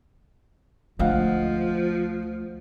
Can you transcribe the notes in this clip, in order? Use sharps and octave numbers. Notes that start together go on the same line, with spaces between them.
D2 F3 A3 D#5 F5 F#5